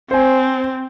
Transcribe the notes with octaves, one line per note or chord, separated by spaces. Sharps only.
C4 C5 G#5